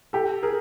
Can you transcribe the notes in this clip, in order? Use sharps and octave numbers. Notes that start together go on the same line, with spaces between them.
G4 A4
G#4 A#4